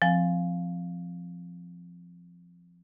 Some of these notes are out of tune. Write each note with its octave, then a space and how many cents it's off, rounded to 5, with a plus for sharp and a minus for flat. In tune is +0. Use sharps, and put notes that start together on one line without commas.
F3 +0 C4 +0 G#5 +0